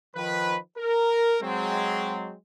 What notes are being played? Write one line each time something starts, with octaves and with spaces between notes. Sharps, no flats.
D#3 F3 B4
A#4
F#3 G#3 C4